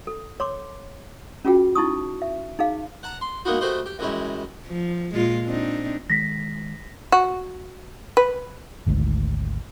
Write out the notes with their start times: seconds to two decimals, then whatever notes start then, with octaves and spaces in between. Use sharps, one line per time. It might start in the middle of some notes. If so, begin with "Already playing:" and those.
0.07 A4
0.40 C#5 C6 D6
1.45 C#4 F4 F#4 G#4 G5
1.75 D#4 E4 A5 C#6 D#6
2.22 E5
2.59 D#4 G#4 F5
3.03 F#5 A5 A#5
3.21 C6
3.45 G#3 A#3 B3 D#4 E4 F#4
3.61 A3 F#4 G4 B4 C5 D#5
3.86 G4
3.99 F#2 E3 G3 G#3 C#4 E4
4.67 F3
5.14 A#2 G#3 F4
5.45 C4 D4 D#4
6.10 D#3 G#3 A#6 B6
7.12 F#4
8.17 B4
8.87 G#1 D2 G#2